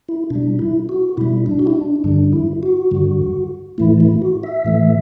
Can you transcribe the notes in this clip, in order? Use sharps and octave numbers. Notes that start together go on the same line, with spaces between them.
E4
B2 G3 D4
E4
F#4
B2 G3 E4
D4
F#4
E4
D4
G2 D3 G3 D4
E4
F#4
G2 D3 G3
A2 E3 A3 E4
E4
F#4
E5
A2 E3 A3